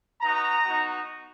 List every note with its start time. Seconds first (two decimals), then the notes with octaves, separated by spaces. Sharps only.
0.21 B3 D#4 F#4 A#5
0.65 B3 D#4 F#4